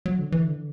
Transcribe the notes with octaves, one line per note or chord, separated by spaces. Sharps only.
F#3
D3
E3
D3